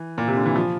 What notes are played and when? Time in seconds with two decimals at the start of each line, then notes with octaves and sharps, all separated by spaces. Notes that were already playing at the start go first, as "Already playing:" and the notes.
Already playing: E3
0.18 A#2
0.28 C3
0.36 D3
0.45 E3
0.56 F3